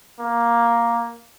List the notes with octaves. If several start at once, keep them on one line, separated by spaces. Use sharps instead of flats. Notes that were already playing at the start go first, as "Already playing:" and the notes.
A#3